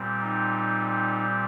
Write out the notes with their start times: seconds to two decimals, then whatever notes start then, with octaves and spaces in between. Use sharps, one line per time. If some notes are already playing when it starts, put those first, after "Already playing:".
Already playing: A#2 G3 C4
0.22 D#4